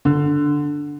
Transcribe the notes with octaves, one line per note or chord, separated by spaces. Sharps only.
D3